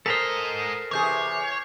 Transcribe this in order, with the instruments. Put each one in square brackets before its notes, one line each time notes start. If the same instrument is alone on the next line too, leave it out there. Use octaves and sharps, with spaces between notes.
[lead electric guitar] G#2 D#5 [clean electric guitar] A4 A#4 C5 [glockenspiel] F6 B6
[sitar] E2 C3 G#4 [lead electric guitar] C#5 [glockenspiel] D6 G6 C7